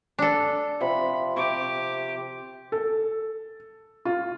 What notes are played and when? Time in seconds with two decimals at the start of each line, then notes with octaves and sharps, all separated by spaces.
0.19 D4 A4
0.81 C3 F3 B5
1.36 C3 G4 D6
2.72 A4
4.05 F4